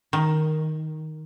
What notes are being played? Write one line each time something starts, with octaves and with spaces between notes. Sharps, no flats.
D#3